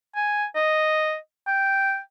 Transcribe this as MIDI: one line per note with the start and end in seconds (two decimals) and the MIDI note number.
0.16 0.45 80
0.56 1.16 75
1.47 1.99 79